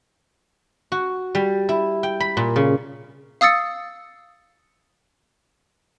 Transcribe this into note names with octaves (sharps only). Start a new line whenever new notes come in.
F#4
G3
E4
G5
B5
A#2
C#3
F5 D#6 E6 A6 C#7